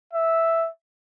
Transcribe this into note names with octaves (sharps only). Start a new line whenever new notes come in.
E5